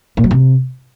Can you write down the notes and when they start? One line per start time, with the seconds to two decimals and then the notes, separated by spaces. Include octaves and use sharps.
0.17 A#2
0.24 F#3
0.31 C3